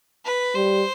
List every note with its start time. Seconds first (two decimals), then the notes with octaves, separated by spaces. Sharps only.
0.25 B4
0.55 G3 C5